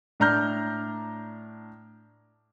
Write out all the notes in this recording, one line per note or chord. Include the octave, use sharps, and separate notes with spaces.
A2 D4 A#5 F6 G6